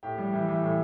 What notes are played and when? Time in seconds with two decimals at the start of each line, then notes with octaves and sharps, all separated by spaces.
0.03 A2 G4
0.18 G3
0.33 E3
0.48 E3
0.63 A2